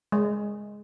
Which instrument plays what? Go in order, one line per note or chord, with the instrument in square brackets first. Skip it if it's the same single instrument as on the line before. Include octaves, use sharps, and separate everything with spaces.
[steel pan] G#3